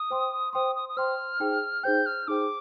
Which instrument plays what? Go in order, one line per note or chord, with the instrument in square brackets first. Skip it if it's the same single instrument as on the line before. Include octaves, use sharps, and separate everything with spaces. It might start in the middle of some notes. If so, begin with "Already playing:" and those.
Already playing: [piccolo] D#6
[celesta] C5 G5 C6
[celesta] C5 G5 C6 [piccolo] D#6
[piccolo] D#6
D#6
[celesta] C5 G5 C6 [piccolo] F6
[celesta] D#4 G#4 C5 G5
[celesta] D#4 G#4 C5 G5 [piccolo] G6
[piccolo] F6
[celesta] D#4 G#4 C5 G5 [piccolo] D6